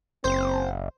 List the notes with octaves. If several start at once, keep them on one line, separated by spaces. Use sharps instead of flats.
F#1 C4 C5